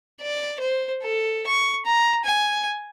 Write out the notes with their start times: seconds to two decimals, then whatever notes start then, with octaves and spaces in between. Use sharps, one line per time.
0.22 D5
0.60 C5
1.03 A4
1.47 C#6
1.86 A#5
2.25 G#5